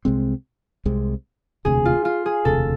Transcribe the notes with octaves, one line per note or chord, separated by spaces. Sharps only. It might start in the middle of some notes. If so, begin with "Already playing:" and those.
C2 C3 G#3 C4
C2 C3 G#3 C4
E1 D2 C3 G#4
F4
F4
G#4
E1 D2 C3 A4